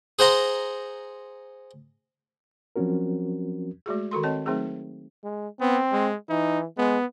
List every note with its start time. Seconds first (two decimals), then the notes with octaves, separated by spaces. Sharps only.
0.19 G#4 C5 F#5 A#5 C6
2.76 F3 F#3 C4 C#4 F#4 A#4
3.86 G#3 A3 F#4 G#4
4.11 D#3 F#4 A4 C6
4.23 C4 C#5 D#5 A5
4.46 F#3 A3 C4 D#4 G#4 A#4
5.24 G#3
5.60 B3 C4
5.92 G#3
6.29 E3 D#4
6.78 G#3 B3